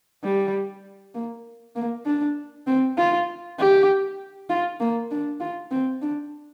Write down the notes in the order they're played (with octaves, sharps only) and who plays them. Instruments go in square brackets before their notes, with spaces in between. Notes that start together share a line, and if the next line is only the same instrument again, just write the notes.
[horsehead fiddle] G3
A#3
A#3
D4
C4
F4
G4
F4
A#3
D4
F4
C4
D4